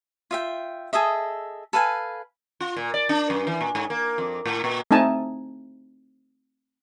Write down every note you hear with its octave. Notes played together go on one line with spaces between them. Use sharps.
F4 E5 G5
G#4 A4 D#5 E5
A4 B4 F5 G#5
F4
A#2
D5
D4
F#2
E3
A#2
G#2
A#3
F2
A2
A#2
A3 C4 D#4 G#5 A5